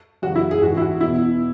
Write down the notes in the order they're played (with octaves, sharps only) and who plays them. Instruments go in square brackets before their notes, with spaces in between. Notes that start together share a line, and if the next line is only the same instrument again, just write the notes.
[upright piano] F#2 C#3 E3 F#4
E4
G#4
G#2 F#4
E3
E4
F#4
E2 B2 E4